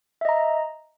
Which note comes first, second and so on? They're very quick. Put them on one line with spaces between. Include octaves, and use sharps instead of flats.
E5 D#5 A#5